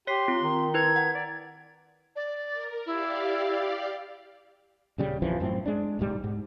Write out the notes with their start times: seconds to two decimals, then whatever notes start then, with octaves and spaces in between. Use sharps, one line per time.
0.07 G4 C#5 C6 B6 C7
0.28 C4 F4
0.41 D#3
0.74 E4 B4 G#6
0.96 F#5
1.14 D5
2.16 D5
2.52 A#4
2.86 E4 G4 D5 F5
4.98 D#1 C#3 G3
5.22 A#1 F2 E3 F3
5.40 F#2 A2 C4
5.66 G#3 D4
5.99 D1 B1 G#2 G3
6.24 G#2